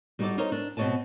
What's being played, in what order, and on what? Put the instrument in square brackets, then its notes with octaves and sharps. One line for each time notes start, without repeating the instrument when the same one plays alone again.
[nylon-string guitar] G3 D#4 F#4 G4 A4 D5
D#4 A4 A#4 C5 C#5
D4
B2 C4 F4 C#5 D#5 A5